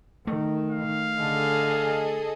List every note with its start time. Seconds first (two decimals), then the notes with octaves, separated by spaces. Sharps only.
0.27 D#3 A3
0.70 F5
1.18 D3 G#4 A4 D#5